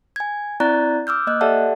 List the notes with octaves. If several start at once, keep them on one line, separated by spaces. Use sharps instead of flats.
G#5 G#6
C4 E4 D5 A#5 F#6 A6
D6 E6 F6 G6
A#3 D#5 F#6
G4 A4 D5 E5 F#5 A5